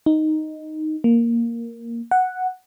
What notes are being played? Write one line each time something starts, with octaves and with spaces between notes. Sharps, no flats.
D#4
A#3
F#5